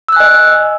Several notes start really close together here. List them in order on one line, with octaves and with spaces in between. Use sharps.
E6 F#6 G#5 D#5